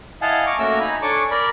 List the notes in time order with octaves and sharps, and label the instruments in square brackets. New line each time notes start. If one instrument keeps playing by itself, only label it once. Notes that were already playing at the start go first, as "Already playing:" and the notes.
[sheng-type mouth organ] E4 D#5 F5 F#5 G#5 A5
G#5 A#5 C#6 D6 F6
A3 A#3 C#4 F#4 A#4 E6
D#4 G#5 A#5 B5
D4 A4 C#5 G#5 C#6 D6
A#4 D5 B5